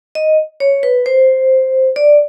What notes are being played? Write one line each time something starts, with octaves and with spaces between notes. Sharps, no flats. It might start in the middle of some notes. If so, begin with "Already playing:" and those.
D#5
C#5
B4
C5
D5